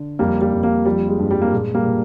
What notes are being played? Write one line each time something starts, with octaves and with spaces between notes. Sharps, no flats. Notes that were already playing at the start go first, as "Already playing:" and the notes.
Already playing: D3
F2 G3 A#3
G3 A#3
F2
G3 A#3
F3 G3
G#3
G2
G3
A#3
A#2 G#3
G3 A#3
A#2